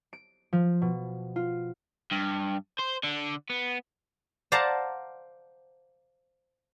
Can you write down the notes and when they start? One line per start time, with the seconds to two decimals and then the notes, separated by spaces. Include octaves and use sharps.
0.13 D7
0.53 F3
0.82 B2
1.36 F4
2.12 G2
2.79 C5
3.03 D3
3.50 B3
4.52 C5 D5 F5 F#5 A5 A#5